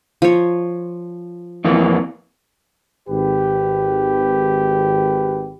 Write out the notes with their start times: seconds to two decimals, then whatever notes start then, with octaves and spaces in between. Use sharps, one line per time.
0.22 F3 C#5
1.64 F2 E3 A#3
3.08 G#1 G4 B4